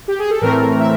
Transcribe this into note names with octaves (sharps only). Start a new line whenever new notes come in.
G4
G#4
A4
A2 E3 A3 C4 A#4
E5